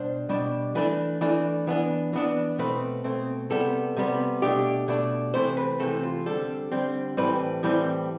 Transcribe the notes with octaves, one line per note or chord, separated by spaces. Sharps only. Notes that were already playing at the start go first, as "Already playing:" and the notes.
Already playing: B2 G3 D4 C5
B2 G3 D4
E3 A3 D4 B4
E3 A3 D4
E3 B3 D4
E3 B3 D4
B2 A3 C4 B4
B2 A3 C4
C3 G3 B3 A4
C3 G3 B3
B2 A3 D4 G4
B2 A3 D4
C3 E3 A3 C4 C5
B4
C3 E3 A3 C4 A4
F4
D3 G3 C4 A4
D3 G3 C4
A2 E3 G3 C4 B4
A2 E3 G3 C4